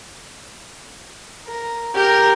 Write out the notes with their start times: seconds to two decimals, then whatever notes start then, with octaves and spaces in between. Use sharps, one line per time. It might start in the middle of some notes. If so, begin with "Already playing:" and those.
1.46 A#4
1.94 G4 A#4